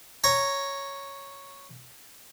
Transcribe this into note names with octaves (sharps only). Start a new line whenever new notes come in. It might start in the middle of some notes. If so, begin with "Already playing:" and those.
C#5 A#5